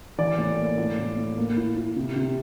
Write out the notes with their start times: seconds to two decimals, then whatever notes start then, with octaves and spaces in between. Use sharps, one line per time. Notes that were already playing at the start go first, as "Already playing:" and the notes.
0.18 E3 D5
0.39 A2
0.58 A#3
0.78 A2
0.98 A2
1.18 A2
1.38 A#3
1.57 E4
1.77 E4
1.96 C3
2.16 C3